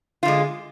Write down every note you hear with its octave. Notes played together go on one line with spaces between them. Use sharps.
D3 G#3 F4